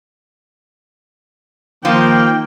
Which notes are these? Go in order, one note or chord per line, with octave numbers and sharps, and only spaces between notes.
D#3 F3 A#3 G5